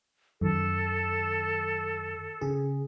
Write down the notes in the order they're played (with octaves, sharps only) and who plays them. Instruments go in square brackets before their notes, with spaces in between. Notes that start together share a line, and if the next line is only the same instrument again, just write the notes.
[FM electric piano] F#2 D#3 [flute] A4
[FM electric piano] C#3 G#4